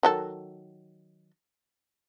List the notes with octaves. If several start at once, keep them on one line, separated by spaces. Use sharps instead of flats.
D#3 F#3 A4